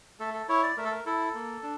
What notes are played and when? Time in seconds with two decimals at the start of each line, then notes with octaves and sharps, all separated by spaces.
0.19 A3 A4
0.34 A4
0.49 E4 C#5
0.63 D5
0.77 A3 A#4
0.85 A4
0.91 A#4
1.06 E4 A4
1.34 A#3
1.63 D4